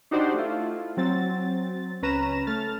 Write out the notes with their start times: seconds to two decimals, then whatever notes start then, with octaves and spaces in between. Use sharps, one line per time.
0.11 D4 D#4 F#4 G4 C5 D5
0.34 A3 E4 F4
0.97 F#3 C4 A6
2.02 C#2 C#4 B4 A#5 E7
2.47 A3 F6 A6